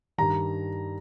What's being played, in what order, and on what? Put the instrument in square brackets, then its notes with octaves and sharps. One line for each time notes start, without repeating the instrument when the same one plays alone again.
[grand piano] G2 D#3 G3 A#5